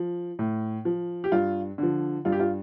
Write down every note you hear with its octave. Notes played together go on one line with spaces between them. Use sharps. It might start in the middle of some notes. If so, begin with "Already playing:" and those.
Already playing: F3
A2
F3
G4
G2 F4
D3 F3
G2 F4
G4
F4